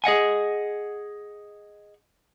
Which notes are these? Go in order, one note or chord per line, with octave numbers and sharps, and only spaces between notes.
G#4 D#5 F#5 G#5